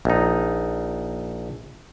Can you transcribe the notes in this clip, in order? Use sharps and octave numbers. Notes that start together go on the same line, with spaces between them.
A#1 D#4